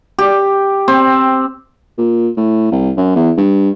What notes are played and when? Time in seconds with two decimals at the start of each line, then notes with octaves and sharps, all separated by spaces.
0.19 G4
0.88 C4
1.98 A#2
2.37 A2
2.71 C2
2.97 F#2
3.15 E2
3.37 G2